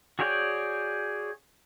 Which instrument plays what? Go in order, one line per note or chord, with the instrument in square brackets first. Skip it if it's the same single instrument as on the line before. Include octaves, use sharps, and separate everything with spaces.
[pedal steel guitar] F#4 G#4 C#5 D5 G5